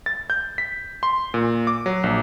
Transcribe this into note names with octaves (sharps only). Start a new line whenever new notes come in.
A6
G6
B6
C6
A#2
D6
F#3
A#1